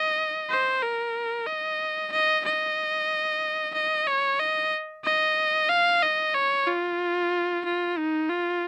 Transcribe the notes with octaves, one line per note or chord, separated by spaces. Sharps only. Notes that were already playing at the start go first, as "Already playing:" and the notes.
Already playing: D#5
C5
A#4
D#5
D#5
D#5
D#5
C#5
D#5
D#5
F5
D#5
C#5
F4
F4
D#4
F4